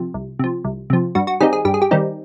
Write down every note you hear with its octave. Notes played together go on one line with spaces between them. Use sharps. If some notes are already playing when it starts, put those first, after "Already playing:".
Already playing: C3 F3
C2
C3 F3
C2
C3 F3
G2 F#4
F#4
D#3 G3 C4 D#4 G#4
G#4
G2 G4
G#4
G4
D#3 G3 C4 D#4